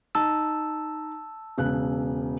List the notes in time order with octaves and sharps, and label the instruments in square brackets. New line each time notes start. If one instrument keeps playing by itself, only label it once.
[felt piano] D#4 [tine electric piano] A5 E6
[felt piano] E1 C#3 F#6